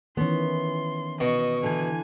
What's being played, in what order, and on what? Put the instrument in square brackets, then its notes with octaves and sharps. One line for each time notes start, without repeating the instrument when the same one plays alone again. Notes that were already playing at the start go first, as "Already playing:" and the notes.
[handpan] D#3 E3 [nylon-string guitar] B3 C#4 [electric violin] C6
[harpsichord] B2 [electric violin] D#5 C#6
[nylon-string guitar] D3 E3 [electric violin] G#5